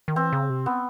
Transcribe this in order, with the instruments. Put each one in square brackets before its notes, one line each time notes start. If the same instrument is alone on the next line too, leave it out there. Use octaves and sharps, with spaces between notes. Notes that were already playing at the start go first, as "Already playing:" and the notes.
[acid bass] D#3
[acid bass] E3 [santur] C4
[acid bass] C#3
C3
[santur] B3